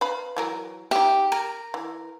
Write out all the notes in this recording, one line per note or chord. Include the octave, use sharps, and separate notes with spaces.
B4 F5 B5
E3 F#3 A#4
D#4 G4 E5
A#4
E3